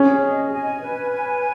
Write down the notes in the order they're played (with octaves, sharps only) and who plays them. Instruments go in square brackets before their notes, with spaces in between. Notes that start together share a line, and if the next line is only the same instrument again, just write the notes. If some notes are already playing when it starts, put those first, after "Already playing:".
Already playing: [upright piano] C#4 [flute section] G#4
[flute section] D#5
G#5
B4
G#5